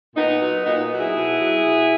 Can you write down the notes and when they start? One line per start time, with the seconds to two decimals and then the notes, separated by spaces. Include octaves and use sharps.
0.15 A#2 B3 D#4
0.41 F#3
0.65 A#2 B3 D#4
0.91 F#3
0.99 E4 G#4
1.16 B2
1.40 F#3
1.65 B2